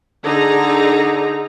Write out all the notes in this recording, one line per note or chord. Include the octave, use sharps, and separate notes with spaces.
D3 D#4 G#4 A#5